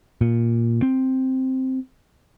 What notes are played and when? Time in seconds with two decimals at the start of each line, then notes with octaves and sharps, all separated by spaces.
0.21 A#2
0.82 C4